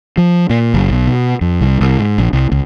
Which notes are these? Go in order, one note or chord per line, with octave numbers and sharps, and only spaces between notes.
F3
A#2
F#1
B1
B2
F2
C2
C2
G#2
A#1
C2
C#2